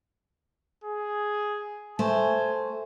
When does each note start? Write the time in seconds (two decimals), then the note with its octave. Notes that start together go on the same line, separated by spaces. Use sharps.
0.84 G#4
1.99 A3 C5 G#5